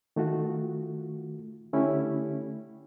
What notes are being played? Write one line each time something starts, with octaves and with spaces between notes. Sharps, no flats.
D#3 A3 F4 F#4
D3 A3 C#4 E4 G4